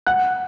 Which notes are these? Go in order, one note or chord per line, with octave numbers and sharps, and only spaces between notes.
F#5 F#6